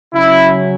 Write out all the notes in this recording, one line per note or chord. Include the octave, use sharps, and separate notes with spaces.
C#3 F#3 C#4 E4